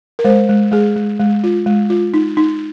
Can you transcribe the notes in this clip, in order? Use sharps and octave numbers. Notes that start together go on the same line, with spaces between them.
A#4
G#3 C5
G#3
G#3 G#4
G#3
G#3
F4
G#3
F4
D#4
D#4